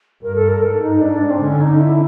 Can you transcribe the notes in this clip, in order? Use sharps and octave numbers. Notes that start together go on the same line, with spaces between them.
G2 A#4
A4
A#4
G#2 A4
D#4
D4
C4
D3 C#4
D#4
E4